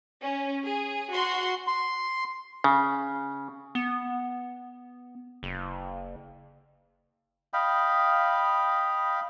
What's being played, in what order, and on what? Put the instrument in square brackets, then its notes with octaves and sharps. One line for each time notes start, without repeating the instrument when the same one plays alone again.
[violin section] C#4
G#4
F#4 C6
[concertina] C6
[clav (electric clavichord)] C#3
[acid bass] B3
F#1
[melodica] D#5 F5 G5 B5